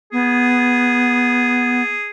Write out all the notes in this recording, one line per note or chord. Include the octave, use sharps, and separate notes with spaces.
B3 G#4